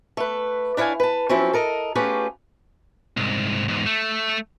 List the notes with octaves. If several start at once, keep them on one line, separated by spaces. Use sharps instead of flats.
A3 B4
D4 E4 C#5 F5 G#5
B4 A5
F3 F#3 C4 C#4 E4
A4 A#4 D#5
A3 C#4 F4 G4 G#4 B4
C2 G#2
E2 G#2
A3